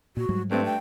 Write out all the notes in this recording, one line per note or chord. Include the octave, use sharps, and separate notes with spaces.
A#2 F#4
G#2 F#3 G3
G2 A3 C4
G5